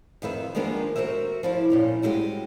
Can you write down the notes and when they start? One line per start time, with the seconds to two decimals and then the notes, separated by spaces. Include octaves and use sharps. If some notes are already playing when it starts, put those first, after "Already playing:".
0.22 F2 D#3 B4 E5
0.55 D#3 F3 G#3 A#3 B3 D4
0.96 F#4 G4 A#4 C5 E5
1.43 F3 E4 D5
1.70 A#2 C#4 D#4
2.02 G3 G#3 E4 F#4 G4